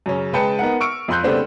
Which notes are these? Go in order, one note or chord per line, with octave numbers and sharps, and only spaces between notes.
F#2 C#3 C#4
C#3 G#3 B4 G5 A5 C#7
B3 D#4 A#4 F#5
C#6 E6 F6 C#7 D7
F2 F4 C6 F#6 G6
C#3 G3 A3 B3 C4 D4